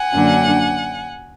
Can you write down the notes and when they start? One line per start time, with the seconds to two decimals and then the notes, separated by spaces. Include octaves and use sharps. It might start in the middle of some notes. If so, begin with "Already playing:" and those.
Already playing: F#5 G#5
0.14 F#2 D3 F#3 A#3 D4